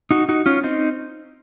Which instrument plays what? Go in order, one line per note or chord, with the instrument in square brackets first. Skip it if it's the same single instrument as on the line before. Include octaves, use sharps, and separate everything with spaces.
[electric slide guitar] D#4 F#4
D#4 F#4
C#4 F4
C4 D#4